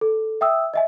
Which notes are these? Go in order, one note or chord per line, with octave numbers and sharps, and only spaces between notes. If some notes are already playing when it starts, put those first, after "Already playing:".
A4
E5 G5 D#6 E6
D#5 E5 G#5